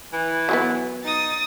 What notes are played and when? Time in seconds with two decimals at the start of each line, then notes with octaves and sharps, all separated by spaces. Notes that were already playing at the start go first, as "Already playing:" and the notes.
0.13 E3
0.49 F#3 G#3 B3
1.04 D#4 D#6 A6